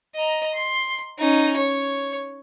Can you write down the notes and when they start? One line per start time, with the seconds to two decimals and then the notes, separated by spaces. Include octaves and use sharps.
0.15 D#5 A#5
0.54 C6
1.18 C#4 D#4
1.56 C#5